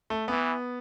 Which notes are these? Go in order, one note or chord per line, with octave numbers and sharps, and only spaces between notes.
A3
E3 B3